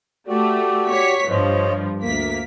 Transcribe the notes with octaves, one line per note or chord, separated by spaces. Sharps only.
A3 F#4 G4 D5
C#5 C#6 B6
G2 F3 C5 C#5 D#5
D2 A#3 B6